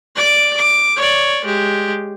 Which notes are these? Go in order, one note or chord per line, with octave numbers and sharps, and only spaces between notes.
D5 D6
D6
C#5 D5
G#3 G4